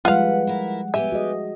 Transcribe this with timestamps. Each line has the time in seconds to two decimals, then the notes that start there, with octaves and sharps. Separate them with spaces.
0.05 F3 G3 G#3 F4 B4 F5 F#5
0.47 E4 A#4
0.94 B3 G4 E5 G#5
1.12 F#4 G#4 D#5